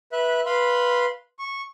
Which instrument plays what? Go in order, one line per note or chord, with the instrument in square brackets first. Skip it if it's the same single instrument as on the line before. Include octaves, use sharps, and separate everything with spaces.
[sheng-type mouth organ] B4 E5 F#6
B4 F5 B5 C6
C#6